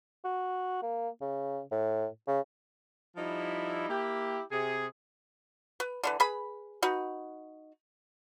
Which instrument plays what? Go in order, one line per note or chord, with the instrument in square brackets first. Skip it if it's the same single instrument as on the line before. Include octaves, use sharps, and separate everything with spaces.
[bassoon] F#4
A#3
C#3
A2
C#3
[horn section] F3 G3 D#4 E4
A#3 E4 G4
C3 G#4
[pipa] B4
D3 E3 B4
G#4 B4 B5
D#4 F#4 B4